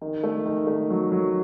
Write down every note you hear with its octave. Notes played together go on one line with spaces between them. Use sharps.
D#3
A3
D#3
A3
F#3
F#3